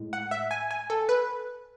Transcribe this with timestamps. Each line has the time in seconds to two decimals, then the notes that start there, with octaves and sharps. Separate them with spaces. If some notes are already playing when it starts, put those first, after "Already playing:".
Already playing: A2 G#3
0.13 F#5
0.31 E5
0.51 G#5
0.71 G#5
0.90 A4
1.09 B4